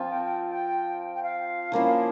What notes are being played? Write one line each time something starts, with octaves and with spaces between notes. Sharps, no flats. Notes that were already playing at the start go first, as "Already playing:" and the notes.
Already playing: F3 C4 F4
G5
G5
G5
G5
F5
F3 A#3 C#4 E4